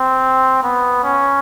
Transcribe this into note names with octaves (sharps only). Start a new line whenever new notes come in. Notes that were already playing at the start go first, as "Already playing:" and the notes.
Already playing: C4
B3
C#4